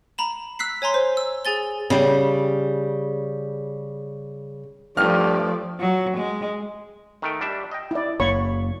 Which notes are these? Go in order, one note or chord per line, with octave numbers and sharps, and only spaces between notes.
A#5 B5 E7
E6 F#6 B6 C7
C#5 G#5 A#5 C6
C5
E6
G#4 G#5 A6 G7
C#3 G3
G2 F3 A3 D5 F6
F#3
G#3
D#3 A3 G5
G3 D4 E5
D#5 G5
E4 D5
F#1 A#3 C#5 B5 C#6